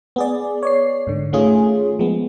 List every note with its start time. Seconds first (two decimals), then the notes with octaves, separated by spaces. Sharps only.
0.16 B3 G#4 D5
0.63 C#5 D5 C7
1.07 G#2 D3
1.33 D#3 A3 C#4 F4 G#4
1.99 F3 G#3 B3